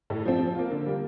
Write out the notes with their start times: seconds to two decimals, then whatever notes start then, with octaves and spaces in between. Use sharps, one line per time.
0.10 A2
0.25 F3 C4
0.40 F3
0.55 A#3 F4
0.71 D3
0.86 G3 A#3